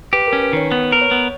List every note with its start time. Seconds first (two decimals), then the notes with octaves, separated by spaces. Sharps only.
0.13 G4 B4
0.27 A#4
0.33 C#4
0.42 B4
0.53 D#3 C#5
0.71 B3 B4
0.92 A#4
1.02 C#5
1.11 B3